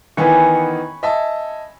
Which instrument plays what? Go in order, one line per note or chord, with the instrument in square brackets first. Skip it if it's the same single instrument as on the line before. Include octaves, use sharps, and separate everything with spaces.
[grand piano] D#3 E3 B3 [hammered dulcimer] G#5 B5 C#6
[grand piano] D#5 E5 A5